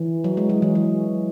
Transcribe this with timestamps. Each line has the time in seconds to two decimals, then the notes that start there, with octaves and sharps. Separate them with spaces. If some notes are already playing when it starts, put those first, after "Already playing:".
Already playing: E3
0.24 F#3
0.37 G#3
0.49 F#3
0.62 E3
0.75 F#3